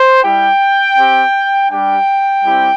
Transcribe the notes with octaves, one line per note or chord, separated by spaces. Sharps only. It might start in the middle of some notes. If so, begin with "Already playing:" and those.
Already playing: C5
G3 E4 G4 G5
C4 G4
G3 D4 G4 G5
G3 C4 E4 G4